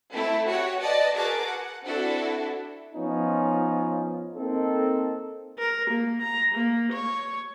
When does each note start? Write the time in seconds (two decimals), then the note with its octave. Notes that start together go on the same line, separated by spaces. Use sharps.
0.12 A3 C4 E4 A4
0.47 F#4 G4 C#5 F#5
0.80 B4 D5 D#5 A5
1.14 F#4 G#4 A#4 B4 A5 D6
1.46 F#5
1.84 C4 D4 E4 F#4 A4
2.95 F3 B3 C#4 D#4 F4
4.36 A#3 C4 D#4 A4
5.59 A#4
5.90 A#3
6.22 A#5
6.55 A#3
6.92 C#5